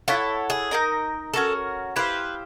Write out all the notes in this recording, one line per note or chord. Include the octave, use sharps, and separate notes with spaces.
E4 F4 A4 C#5 F#5
G#4
D#4 F#4 A#4 D#5
C#4 F#4 A4 A#4
E4 G4 B4 C5 F5